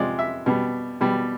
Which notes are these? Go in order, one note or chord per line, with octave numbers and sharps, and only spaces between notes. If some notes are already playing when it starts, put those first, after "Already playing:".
Already playing: C3 F3 G#3 D5
E5
B2 G3
B2 G3